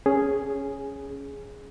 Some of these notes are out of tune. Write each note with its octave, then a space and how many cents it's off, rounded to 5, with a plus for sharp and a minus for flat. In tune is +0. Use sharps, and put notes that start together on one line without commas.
C#4 +0 G#4 +0